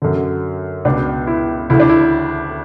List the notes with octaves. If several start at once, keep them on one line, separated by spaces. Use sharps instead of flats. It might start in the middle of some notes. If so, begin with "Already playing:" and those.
F#2 D3
C#2 B2 D4
E4
D2 C#3 E3 E4
D4
E4